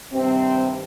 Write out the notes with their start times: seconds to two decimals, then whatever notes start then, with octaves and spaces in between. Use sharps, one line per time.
0.11 G2 C3 D#3 G3 C4